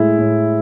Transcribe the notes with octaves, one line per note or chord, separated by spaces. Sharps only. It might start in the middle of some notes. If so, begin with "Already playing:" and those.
Already playing: A2 G#3 E4
A2